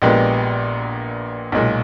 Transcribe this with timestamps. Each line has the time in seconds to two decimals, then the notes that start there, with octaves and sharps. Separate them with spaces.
0.02 A#1 A#2 G#3 B3 G4
1.52 B1 A#2 G#3